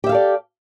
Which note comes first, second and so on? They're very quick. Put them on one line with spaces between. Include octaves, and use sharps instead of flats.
G4 E5 F5 A4 D5